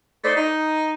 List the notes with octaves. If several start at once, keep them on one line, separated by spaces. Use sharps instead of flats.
A3 D#4 C5 D5
D#4